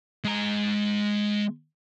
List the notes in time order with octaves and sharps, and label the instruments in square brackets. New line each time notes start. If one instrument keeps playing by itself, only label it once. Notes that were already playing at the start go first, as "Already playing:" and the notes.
[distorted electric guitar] G#3 A#5